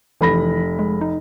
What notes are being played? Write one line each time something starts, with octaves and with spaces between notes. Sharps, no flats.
F1 E3 B5 A#6
G#3
D#4